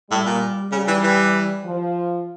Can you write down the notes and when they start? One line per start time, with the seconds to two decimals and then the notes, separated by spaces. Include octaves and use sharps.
0.11 A2 G3
0.26 A#2
0.72 C#3 G3
0.88 E3
1.03 E3
1.64 F3